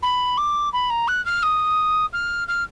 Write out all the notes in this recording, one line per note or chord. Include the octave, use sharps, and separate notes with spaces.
B5
D6
B5
A#5
F#6
F6
D#6
F6
F6